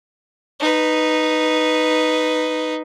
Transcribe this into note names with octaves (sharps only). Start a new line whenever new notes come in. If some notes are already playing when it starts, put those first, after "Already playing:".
D#4 B4